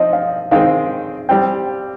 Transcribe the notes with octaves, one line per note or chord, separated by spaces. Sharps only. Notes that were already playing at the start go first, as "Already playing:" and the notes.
Already playing: F3 C4 D#4 D#5
F5
D#3 G#3 C4 F5
G3 C4 G5